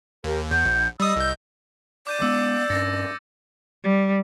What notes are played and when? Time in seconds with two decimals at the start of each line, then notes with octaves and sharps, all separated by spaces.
0.24 D#2 G4 A#4
0.51 E2 F#5 G6
0.65 A#1
1.00 G3 D#5 D#6 E6
1.16 C2 G6
2.07 D5 D6 G6 D#7
2.21 G#3 B3 D6 E6 C#7
2.70 G2 C#4 A6 A#6 C#7
3.84 G3